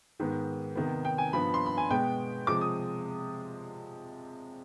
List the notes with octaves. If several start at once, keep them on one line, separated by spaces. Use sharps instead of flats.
G#2 D#3 B3
C3 D#3 B3
G5
G#5
G2 F3 B3 B5
C6
B5
G#5
B2 G#3 B3 G5
C3 F3 G#3 D6
D#6